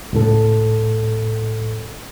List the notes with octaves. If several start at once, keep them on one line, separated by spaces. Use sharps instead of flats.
C#2 A2 A4